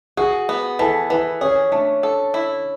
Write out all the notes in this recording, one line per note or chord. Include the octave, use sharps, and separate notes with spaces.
F#4 G#4
B3
E3 A4
E3 B4
C#4 G#4
A3 D4
A4
E4